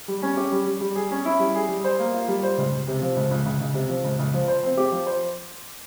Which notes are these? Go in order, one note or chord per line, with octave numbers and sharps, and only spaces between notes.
G3
C#4
G4
G3
G3
G3
G#4
C#4
E4
G3
G#4
G3
C5
A#3
F4
G3
C5
C#2
C#2
C3
F3
C#2
C#2
C#2
C#2
C3
F3
C#2
C#2
F3
C5
C4
G4
F3
C5